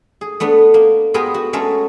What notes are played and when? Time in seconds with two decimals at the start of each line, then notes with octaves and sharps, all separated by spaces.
0.21 G#4
0.40 A3 B3 D4
0.74 A#3
1.14 B3 F4 G4 G#4 A#4 B4
1.34 F#4
1.53 G#3 A3 C#4 A4 A#4